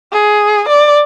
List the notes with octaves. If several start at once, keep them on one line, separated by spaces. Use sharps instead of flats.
G#4
D5